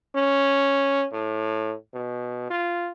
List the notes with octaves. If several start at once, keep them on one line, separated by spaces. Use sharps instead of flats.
C#4
A2
B2
F4